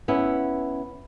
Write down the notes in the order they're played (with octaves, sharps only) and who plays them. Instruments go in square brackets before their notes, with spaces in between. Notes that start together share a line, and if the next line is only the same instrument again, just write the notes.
[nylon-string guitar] B3 C#4 E4